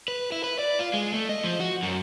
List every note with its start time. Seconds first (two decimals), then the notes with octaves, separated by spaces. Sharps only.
0.08 B4
0.32 E4
0.44 B4
0.59 D5
0.79 F4
0.94 G#3
1.14 A3
1.29 D#5
1.44 F3
1.60 F#4
1.83 F#2